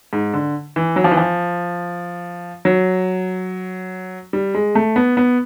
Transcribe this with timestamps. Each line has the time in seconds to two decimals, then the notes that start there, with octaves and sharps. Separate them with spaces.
0.13 G#2
0.34 D3
0.76 E3
0.96 F#3
1.04 F3
1.11 E3
1.17 F3
2.65 F#3
4.33 G3
4.54 G#3
4.75 A3
4.96 B3
5.17 B3